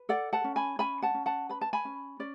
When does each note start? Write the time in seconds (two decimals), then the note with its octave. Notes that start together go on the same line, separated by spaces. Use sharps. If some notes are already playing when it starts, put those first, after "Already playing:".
Already playing: B4
0.09 A4 D5 F#5
0.33 F#5 A5
0.44 C#4
0.56 G#5 B5
0.79 C#4 G#5 B5
1.02 F#5 A5
1.14 C#4
1.26 F#5 A5
1.49 B4 B5
1.61 A5
1.73 G#5 B5
1.85 C#4
2.19 C#4 D5